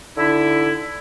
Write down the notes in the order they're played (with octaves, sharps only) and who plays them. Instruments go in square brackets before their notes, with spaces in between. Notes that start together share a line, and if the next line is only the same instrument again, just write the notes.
[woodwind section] D3 D#4 E4